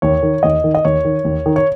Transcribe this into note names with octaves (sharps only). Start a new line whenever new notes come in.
D#2 C#5
D#3
D#2 D#5
D#3
D#5
D#2 C#5
D#3
D#2
D#3
C#5